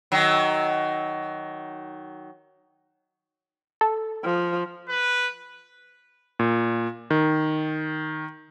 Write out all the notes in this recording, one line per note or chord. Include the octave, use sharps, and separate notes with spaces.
D#3 F#3
A4
F3
B4
A#2
D#3